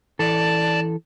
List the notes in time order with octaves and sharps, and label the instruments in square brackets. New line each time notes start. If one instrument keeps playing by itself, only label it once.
[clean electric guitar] E3 A4 [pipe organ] D5 A5